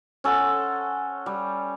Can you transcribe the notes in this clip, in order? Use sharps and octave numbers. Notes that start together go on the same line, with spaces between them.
C#4 A4 F#5 C6
G3